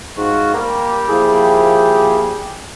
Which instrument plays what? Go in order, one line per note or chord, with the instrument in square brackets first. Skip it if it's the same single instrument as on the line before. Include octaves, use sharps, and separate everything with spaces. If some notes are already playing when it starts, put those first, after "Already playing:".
[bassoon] G#2 [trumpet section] F4 F#4
[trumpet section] G3 G4 [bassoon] A#3
[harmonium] F3 A#3 E4 [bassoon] G#4